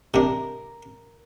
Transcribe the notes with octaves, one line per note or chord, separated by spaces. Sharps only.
C3 D4 A#4